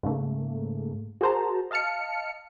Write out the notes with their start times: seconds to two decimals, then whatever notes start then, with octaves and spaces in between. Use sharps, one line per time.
0.03 G#2 C#3 A3 A#3
1.21 F#4 G#4 A#4 C5 A5 A#5
1.71 D#5 F5 A5 F6 C#7